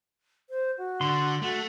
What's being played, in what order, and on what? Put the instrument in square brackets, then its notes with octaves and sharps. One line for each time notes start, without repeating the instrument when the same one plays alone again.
[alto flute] C5
F#4
[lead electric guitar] D3 [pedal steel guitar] C6
[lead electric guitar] A3 [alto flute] F#4